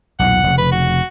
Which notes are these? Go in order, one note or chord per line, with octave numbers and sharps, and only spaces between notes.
B1 E2 A#2 F#5
F1 C#3
B4
F#4